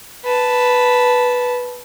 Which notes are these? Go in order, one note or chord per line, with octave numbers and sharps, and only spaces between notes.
B4 A5